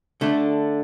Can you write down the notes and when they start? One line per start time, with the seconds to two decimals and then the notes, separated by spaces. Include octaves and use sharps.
0.21 D3 A3 D4